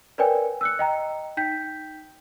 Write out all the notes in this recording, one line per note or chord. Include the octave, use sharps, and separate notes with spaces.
A#4 B4 C#5 D5 G5 G#5
E6 F#6 C#7
D#5 G5 A#5
D#4 G5 G6 B6